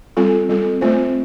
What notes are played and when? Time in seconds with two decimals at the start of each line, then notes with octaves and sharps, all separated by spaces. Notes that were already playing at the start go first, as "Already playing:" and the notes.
0.17 G3 C4 F4 A4
0.49 G3 C4 F4 A4
0.81 A3 C4 F4 C5